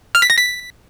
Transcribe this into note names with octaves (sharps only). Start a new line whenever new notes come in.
F6
B6
A#6
B6